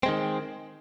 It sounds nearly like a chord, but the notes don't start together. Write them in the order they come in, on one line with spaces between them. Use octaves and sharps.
C4 G#3 D#3